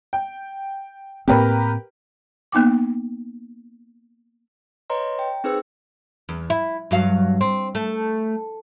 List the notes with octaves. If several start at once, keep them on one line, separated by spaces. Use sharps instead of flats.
G5
A2 A#3 C4 G4 A#4 B4
A#3 B3 D#4 G5 D6
B4 C#5 D#5 A#5 C6
G5
C4 D#4 G#4 B4 C5 E6
E2
E4
G2 F#3 F5
C4
A3